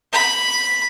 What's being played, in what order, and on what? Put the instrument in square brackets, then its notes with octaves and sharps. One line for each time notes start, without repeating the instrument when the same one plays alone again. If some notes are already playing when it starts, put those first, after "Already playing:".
[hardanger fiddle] B5